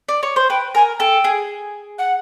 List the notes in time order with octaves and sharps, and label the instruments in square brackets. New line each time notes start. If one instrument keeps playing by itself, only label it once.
[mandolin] D5
C#5
C5
[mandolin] B4 [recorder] G5
[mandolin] A#4 [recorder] G#5
[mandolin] A4 [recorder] G5
[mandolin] G#4
[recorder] F#5